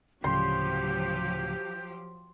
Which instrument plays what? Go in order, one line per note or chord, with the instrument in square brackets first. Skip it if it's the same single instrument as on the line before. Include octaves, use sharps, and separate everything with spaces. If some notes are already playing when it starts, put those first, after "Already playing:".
[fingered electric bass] D2 A2 C#3 [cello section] F3 F#3 G4 [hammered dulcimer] C6 [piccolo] G6